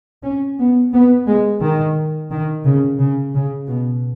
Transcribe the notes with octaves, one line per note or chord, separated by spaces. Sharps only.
C#4
B3
B3
G#3
D#3
D#3
C#3
C#3
C#3
B2